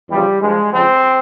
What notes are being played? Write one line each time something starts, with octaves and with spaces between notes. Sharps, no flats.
E2 C#3 F3 G3
G2 F3 G#3
F2 C#3 F3 C4